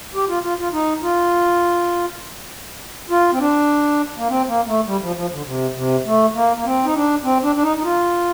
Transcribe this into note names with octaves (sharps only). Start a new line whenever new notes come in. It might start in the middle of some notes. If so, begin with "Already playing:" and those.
G4
F4
F4
F4
D#4
F4
F4
C4
D4
A#3
C4
A#3
A3
G3
F3
F3
D3
C3
C3
A3
A#3
A#3
C4
D#4
D4
C4
D4
D4
D#4
D#4
F4